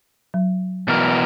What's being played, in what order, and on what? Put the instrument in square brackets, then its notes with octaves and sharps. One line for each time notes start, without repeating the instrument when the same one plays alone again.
[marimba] F#3
[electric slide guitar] B2 E3 A#4